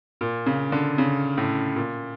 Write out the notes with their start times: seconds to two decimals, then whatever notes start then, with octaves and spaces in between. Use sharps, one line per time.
0.21 A#2
0.46 C#3
0.72 D3
0.98 C#3
1.38 A2
1.76 A#2